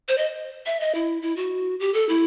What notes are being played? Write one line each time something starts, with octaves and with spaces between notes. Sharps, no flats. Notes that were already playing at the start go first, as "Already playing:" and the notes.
C5
D#5
E5
D#5
E4
E4
F#4
G4
A4
E4